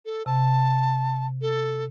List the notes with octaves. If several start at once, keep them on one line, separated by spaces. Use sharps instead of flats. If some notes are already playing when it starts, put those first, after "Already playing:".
A4
C3 A5
A4